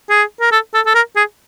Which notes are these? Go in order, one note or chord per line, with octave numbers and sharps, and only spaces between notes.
G#4
A#4
A4
A4
A4
A#4
G#4